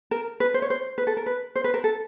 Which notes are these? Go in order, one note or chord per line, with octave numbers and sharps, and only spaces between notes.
A#4
B4
C5
C#5
C5
B4
A4
A#4
B4
C5
B4
A#4
A4